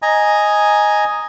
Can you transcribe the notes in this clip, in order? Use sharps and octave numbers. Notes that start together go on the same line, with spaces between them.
D#5 G#5 A#5